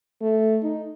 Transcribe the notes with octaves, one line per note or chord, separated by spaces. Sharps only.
A3
D#4